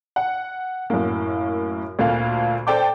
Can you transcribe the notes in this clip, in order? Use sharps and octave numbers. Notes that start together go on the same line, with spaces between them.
F#5
F#2 A2 A#3
D2 A#2 A4 F5
A4 C5 D5 G5 A5 D6